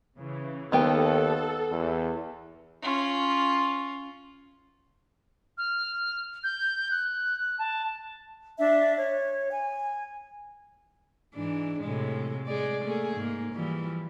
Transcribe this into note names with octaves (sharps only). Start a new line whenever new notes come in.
C#3 E3
D#2 D#3 B3 A4 G5
E2
C#4 F4
F6
G6
F#6
A5
D4 E5
C#5
G#5
G#2 E3 D4
A2 C3 G#3
G#3 G#4 D5
A3 A#3 G#4
G#2 A#3
E3 F3 G3